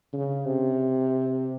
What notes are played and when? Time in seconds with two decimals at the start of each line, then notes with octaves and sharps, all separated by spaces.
0.13 C#3
0.46 C3